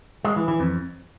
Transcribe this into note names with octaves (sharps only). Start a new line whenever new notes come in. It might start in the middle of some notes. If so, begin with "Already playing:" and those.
G#3
E3
E3
F2